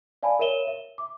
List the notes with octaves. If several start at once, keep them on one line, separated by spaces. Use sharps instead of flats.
D5 F5 G#5 A5 B5
A#4 C#5 E5 D#7 E7 G7
E5
D6